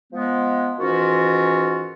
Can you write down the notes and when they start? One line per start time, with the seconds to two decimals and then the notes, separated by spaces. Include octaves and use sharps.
0.13 F3 G#3 B3
0.78 G#2 D#3 E3 C#4 F4 F#4